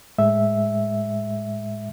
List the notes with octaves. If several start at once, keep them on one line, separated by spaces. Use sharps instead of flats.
A2 G#3 E5